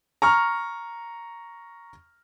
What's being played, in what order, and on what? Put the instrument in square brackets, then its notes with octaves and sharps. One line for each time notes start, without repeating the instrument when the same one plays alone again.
[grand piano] A#5 C#6 F6